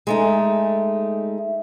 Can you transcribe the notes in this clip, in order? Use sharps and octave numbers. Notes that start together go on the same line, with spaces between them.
G#3 A3 D#4